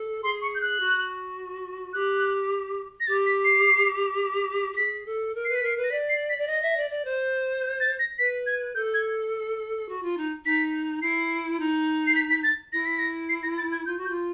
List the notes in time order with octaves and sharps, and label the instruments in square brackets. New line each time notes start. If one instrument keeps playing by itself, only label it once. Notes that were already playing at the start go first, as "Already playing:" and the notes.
Already playing: [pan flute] A4
[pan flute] G#4 [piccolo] C6
[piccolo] C#6
G6
F#6
[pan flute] F#4
[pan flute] G4 [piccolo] F#6
[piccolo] A#6
[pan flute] G4 [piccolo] A6
[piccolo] B6
C7
[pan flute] G4
[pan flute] G#4 [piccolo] B6
[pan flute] A4
A#4
[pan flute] B4 [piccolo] C7
[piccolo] B6
[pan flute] A#4 [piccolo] C7
[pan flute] B4
[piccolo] A#6
[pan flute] D5 [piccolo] B6
[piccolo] C7
B6
[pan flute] D5
[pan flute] D#5 [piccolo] A#6
[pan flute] E5
D5
D5
C5
[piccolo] A6
A#6
[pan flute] B4 [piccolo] B6
[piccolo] G#6
[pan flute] A4 [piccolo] G6
[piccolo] G#6
[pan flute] F#4
F4
D#4
[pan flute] D#4 [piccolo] B6
[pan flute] E4 [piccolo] C7
[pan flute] D#4
[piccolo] C7
B6
B6
A6
[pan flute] E4 [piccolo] A#6
[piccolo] B6
A#6
C7
A#6
A6
G#6
[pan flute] F4 [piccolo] G6
[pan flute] F#4
[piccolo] G6
[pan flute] F4